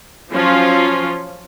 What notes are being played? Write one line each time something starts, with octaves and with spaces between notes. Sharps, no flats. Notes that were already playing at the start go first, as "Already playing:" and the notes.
F3 F#3 C#4 F4